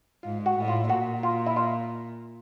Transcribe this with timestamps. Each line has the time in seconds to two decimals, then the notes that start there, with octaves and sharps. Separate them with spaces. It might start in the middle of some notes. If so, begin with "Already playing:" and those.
0.23 G#2 F4
0.46 F#4
0.57 A2
0.68 F4
0.89 A#2 F#4
1.23 F4
1.47 E4
1.56 F4